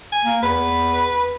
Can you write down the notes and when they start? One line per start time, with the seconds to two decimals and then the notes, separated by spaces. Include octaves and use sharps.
0.12 G#5
0.24 A#3
0.43 E2 B4